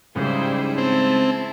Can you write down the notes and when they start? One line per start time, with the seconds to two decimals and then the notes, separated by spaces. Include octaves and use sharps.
0.16 G#2 C#3 G3 E4 G#4 C5
0.78 C4 A5